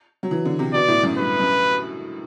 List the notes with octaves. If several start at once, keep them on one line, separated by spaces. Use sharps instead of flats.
F#3
E3
D3
C3
B2 D5
A2
F#2
G2 B4
F#2